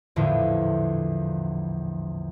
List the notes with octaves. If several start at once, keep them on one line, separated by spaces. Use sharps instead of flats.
A#1 E2 A2 D3 F3